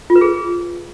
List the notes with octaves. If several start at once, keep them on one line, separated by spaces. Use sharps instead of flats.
F4
B4
G#4